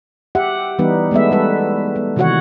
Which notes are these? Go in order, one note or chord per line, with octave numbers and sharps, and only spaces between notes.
G4 E5 F#5
E3 G3 B3 D#4 B4
G#3 A3 B3 E5
G3 A4 B4
B3
C3 D#3 E3 F#4 C#5 F#5